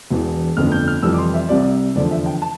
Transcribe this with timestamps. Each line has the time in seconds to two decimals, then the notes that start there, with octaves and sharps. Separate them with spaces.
0.11 E1 E2 E3
0.56 G1 F2 D3 F3 A3 F6
0.72 G6
0.88 F6
1.02 F1 F2 E3 G3 E6
1.13 D6
1.18 C6
1.34 E5
1.49 C2 C3 G3 D5
1.95 F1 E2 D3 F3 D5
2.11 E5
2.26 G5
2.42 A5